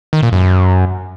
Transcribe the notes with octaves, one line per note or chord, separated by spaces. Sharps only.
D#3
A#2
F#2